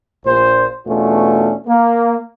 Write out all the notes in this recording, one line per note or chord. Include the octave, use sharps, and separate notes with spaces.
A#1 A#2 C5
E2 B2 A3 C#4 D4 F4
A#3